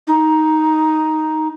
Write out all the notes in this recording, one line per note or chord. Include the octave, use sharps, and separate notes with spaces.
D#4